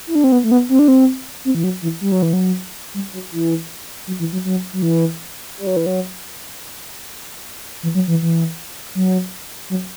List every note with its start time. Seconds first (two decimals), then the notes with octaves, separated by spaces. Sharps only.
0.07 E4
0.15 D4
0.24 C4
0.32 B3
0.44 A3
0.51 B3
0.69 C4
0.79 D4
0.88 C4
1.45 C4
1.55 E3
1.64 F#3
1.82 E3
2.01 G3
2.12 F#3
2.22 E3
2.33 F#3
2.94 G3
3.13 F#3
3.32 E3
4.07 F#3
4.19 E3
4.33 F#3
4.45 F#3
4.73 F#3
4.82 E3
5.57 G3
5.67 F#3
5.77 E3
5.86 F#3
7.83 E3
7.95 F#3
8.08 E3
8.22 E3
8.95 F#3
9.70 F#3